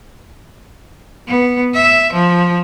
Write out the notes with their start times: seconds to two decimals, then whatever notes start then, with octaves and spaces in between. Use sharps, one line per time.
1.28 B3
1.74 E5
2.13 F3